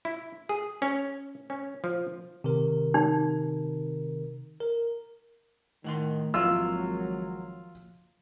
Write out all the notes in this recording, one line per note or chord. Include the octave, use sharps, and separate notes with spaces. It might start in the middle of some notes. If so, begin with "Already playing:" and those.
E4
G#4
C#4
C#4
F3
C3 D#3 A#4
D#4
A#4
A2 D#3 F#5 C6
G#1 F3 F#3 A#3 E4 F4 E6